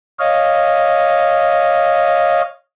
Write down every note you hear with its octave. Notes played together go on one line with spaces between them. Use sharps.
C#5 D#5 F5